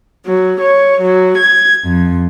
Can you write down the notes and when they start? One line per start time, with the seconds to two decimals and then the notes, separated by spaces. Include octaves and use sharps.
0.25 F#3
0.61 C#5
1.00 F#3
1.37 G#6
1.86 F2